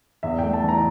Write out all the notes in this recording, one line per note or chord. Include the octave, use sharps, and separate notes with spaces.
E2 E5
A3 G5
A5
E3 A#5